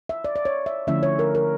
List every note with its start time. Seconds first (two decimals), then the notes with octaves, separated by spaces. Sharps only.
0.09 E5
0.25 D5
0.36 D5
0.45 C#5
0.66 E5
0.87 D3 F3 A3 C#4 E4 E5
1.03 C#5
1.19 A#4
1.35 A#4